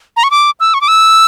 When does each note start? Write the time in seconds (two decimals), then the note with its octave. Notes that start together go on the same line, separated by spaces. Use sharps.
0.17 A#5
0.24 C#6
0.31 D6
0.60 E6
0.74 C#6
0.81 D6
0.88 E6